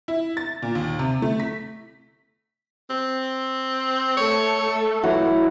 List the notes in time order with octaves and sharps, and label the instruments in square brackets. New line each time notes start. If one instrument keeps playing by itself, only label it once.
[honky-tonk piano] E4
A6
A#2
D#2
C3
A3
B6
[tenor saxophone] C4
[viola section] A3 A4 [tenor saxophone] C#5
[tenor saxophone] E3 [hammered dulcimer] F#3 E4 F#4